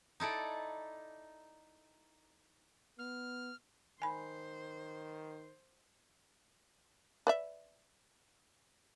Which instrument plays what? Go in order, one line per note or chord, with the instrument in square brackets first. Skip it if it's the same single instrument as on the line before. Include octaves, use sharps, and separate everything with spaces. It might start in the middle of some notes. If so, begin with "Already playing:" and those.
[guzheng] D#4 E4 A4 D5
[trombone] B3 [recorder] F6
[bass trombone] D#3 [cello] C5 [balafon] G#5 B5
[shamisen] B4 D5 E5